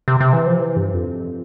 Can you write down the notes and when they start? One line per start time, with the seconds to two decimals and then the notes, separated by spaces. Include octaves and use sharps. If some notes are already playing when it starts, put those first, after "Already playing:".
0.08 C3
0.20 C3
0.33 E3
0.46 F3
0.59 E3
0.77 G2
0.94 F2